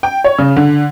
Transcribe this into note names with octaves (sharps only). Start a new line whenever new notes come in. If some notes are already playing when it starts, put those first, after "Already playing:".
G5
C#5
C#3
D3